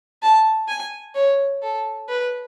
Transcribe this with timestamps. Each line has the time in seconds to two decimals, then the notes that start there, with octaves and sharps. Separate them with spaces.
0.22 A5
0.68 G#5
1.15 C#5
1.62 A4
2.08 B4